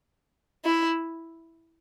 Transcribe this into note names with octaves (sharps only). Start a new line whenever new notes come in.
E4